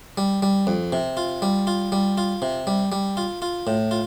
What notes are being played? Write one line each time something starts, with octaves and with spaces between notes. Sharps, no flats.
G3
G3
F2
C3
F4
G3
F4
G3
F4
C3
G3
G3
F4
F4
A2
F4